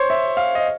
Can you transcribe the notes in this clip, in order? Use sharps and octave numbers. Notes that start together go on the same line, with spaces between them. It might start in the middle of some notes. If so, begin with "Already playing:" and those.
Already playing: C5 C#5
E5
F5
D#5